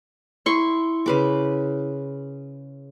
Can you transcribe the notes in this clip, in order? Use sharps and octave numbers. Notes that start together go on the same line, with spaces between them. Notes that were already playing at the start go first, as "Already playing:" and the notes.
E4 C6 C#6
C#3 B4 D6